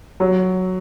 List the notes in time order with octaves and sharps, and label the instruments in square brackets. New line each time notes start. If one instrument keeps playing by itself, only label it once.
[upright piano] F#3